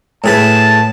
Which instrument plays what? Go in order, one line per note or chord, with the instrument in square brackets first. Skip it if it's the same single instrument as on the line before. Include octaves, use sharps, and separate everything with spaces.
[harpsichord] A2 G#4 B4 [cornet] A5